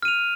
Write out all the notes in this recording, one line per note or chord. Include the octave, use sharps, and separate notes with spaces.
F6 D#7 F7